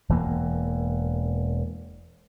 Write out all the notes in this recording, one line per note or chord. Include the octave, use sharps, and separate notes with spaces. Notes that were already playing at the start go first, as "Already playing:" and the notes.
E1 E3 A#3